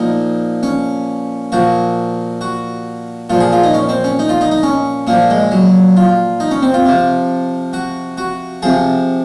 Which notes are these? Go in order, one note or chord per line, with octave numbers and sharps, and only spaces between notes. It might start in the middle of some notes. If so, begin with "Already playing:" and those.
Already playing: A#2 F3 D#4
C#4
A#2 F3 F#4
F#4
A#2 F3 F4
G#4
F4
D#4
C#4
C4
C#4
D#4
F4
D#4
D#4
C#4
A#2 F3 A#3
G#3
F#3
F4
D#4
C#4
C4
F4
C3 F3
F#4
F#4
C3 F3 G#4